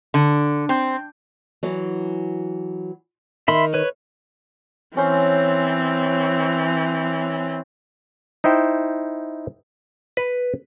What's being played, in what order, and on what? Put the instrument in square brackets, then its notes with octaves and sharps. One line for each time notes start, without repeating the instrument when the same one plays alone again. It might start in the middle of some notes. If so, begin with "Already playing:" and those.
[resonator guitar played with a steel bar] D3
C4
[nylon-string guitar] E3 F#3
[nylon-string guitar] D#3 [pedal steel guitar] E5 B5 C6
[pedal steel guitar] B4 C#5
[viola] E3 C4 [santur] C#4 C5
[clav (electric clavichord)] D#4 E4 C5 G5
B4